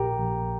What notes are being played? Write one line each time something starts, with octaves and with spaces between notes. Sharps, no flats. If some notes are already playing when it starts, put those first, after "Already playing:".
Already playing: A#1 A#2 G4 A#4 G5 A#5
A#1